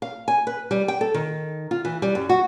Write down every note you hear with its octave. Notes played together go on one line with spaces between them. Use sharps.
F5
G#5
B4
G3
G5
A4
D#3
F4
E3
G3
F#2
F#4